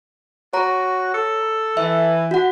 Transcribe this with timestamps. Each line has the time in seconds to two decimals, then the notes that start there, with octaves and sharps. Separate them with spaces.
0.53 F#4 C#5 A#5
1.14 A4
1.77 E3 E5
2.31 F#4 F#5